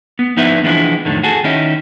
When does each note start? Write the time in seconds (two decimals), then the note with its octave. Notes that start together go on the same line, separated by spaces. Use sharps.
0.19 B3
0.37 F3 B3 D#4 E4 B4 E5
0.64 E3 F3 G#3 B3 D4 E4
1.05 F2 A2 D3 D#3
1.23 F#4 G#4 A4
1.44 D#3 C#4 D#4 E4